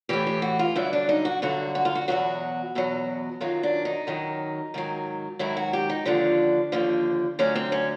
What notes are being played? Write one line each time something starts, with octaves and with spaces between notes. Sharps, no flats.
A2 E3 G4
G4
F#4
F4
G2 D3 F#3 E4
D4
D#4
F#4
G2 D3 F#3 F#4
F#4
F4
F#4
E2 B2 F#3 F#4
E2 B2 F#3
F#2 D#3 F#3 F4
D4
D#4
F#2 D#3 F#3
G#2 D#3 F#3
G#2 D#3 F#3 E4
F#4
G4
D#4
D#2 D3 F3 D4
D#2 D3 F3
D2 D3 F#3 C#4
C4
C#4